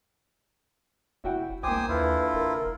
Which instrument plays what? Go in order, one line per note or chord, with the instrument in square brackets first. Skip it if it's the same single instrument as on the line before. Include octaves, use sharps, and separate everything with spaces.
[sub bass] F1 [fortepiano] E4 F#4 G5
[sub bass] C2 [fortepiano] A#3 D6 [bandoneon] C5 G#5 D#6 [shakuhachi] G5
[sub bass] D#2 [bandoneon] D3 E4 F4 [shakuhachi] B4
[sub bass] F1 [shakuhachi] A#4